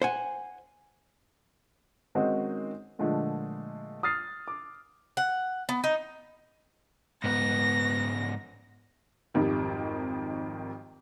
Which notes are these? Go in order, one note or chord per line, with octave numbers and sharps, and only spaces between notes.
C5 F#5 G#5
D#3 G#3 C4 C#4 D#4 F#4
A#2 D3 F3 G#3 A3
D#6 F6 A6 C7
D6
F#5
B3
D#4
G#2 B3 A#6
G#1 F2 D#3 G3